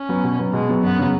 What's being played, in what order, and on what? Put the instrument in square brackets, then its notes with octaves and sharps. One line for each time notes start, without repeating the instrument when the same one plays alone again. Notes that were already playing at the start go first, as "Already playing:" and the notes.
Already playing: [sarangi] C#4
[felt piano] F#3 B3
B2
F#3 B3
[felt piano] B2 [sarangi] G#3
[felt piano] F#3 B3
[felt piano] F#2 [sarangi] B3
[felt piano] C#3 F#3